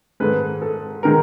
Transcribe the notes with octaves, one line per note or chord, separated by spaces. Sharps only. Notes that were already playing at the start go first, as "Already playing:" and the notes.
G#2 D#3 G#3 A4 B4
A4
D#3 G#3 A#4